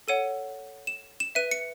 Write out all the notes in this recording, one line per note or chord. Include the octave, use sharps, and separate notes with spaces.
A4 C#5 F#5 D#7
E7
E7
B4 E5 D#7
C#7